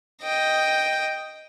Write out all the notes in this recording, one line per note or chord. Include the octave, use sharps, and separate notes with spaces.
D#5 G5